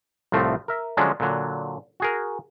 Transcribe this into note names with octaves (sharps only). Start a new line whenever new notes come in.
C2 A2 F3 A3 C4
A#4 E5
D3 F3 F#3 G#3 C#4 D4
A#2 D3 F#3
F#4 G#4 A#4